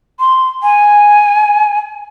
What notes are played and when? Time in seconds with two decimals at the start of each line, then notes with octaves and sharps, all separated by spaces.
0.20 C6
0.63 G#5